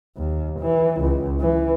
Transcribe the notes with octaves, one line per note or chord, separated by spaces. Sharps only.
D#2
E3
C#2
E3